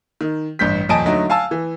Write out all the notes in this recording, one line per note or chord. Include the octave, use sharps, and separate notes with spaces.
D#3
A1 G2 G6 B6
D#1 F2 D#5 G#5 A5 D7
D3 F#3 A3 D#4
F5 G#5 A5 E6
E3